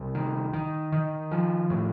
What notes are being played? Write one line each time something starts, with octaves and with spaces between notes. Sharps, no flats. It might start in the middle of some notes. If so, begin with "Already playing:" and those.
Already playing: C2
D#3
D#3
D#3
F3
A2